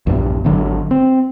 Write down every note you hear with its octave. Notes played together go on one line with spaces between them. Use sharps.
A#1 E2 G2
G#1 D3 F#3
C4